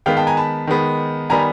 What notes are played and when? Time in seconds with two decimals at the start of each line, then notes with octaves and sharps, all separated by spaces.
0.06 D#3 G#3 B3 F5 G5
0.17 G5 A5
0.27 G#5 A#5
0.37 A5 B5
0.67 D#3 G#3 B3
1.30 D#3 G3 B3 G#5 A#5